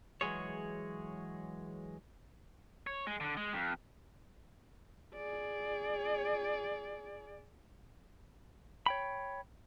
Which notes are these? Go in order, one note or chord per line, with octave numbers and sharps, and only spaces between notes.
E3 F#3 G#3 G#4 C#5
C#5
G#3
D3
G#3
F2
G#4 D5
C#5 G5 B5